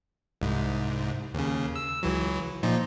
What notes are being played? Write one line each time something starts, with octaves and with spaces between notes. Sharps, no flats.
C2 G#2
D#2 C#3
E6
C#2 E3 F#3
A#2 F3 D#4